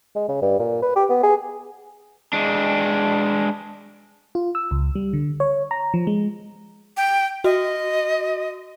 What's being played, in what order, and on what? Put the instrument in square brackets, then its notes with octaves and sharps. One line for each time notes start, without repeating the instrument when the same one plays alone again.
[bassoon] G#3
C#3
G2
A#2
B4
G4
B3
G#4
[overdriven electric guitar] G#3 D4
[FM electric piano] F4
E6
C#2
G3
D3
C#5
A#5
F3
G#3
[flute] G5
[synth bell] F#4 [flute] D#5